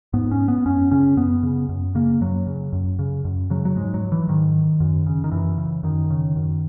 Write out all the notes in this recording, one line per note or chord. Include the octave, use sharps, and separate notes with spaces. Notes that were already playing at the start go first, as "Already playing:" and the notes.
G#2 B3
C#4
B3
F#2 C#4
C#3 C#4
F#2 B3
C#3
F#2
C#3 A#3
F#2 F#3
C#3
F#2
C#3
F#2
C#3 F#3
F#3
G#2 G#3
F#3
E3
G#2 D#3
F#2
C#3
D#3
F#2 E3
C#3
F#2 D#3
C#3
F#2